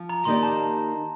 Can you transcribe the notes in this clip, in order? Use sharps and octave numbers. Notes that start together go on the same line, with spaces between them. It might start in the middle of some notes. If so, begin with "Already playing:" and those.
Already playing: F3
A#5
D#3 A#3 D#4 G4 D5 C6
A5